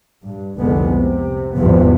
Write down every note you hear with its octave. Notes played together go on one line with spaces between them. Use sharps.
G2
F1 C2 D3 G#3 B3
C3
G#1 E2 G2 C3 F3 B3